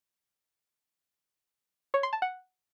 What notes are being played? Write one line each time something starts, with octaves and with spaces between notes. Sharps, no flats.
C#5
C6
A5
F#5